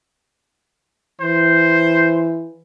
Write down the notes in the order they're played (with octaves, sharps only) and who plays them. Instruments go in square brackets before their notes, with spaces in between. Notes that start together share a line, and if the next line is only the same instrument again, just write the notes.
[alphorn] E3 [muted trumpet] C5